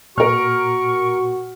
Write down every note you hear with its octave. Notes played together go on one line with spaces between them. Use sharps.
A#2 F#4 A#4 C#6 F6